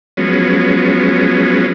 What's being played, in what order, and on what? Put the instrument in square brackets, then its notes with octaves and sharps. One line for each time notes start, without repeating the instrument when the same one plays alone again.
[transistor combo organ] F3 F#3 G#3 B3 C#4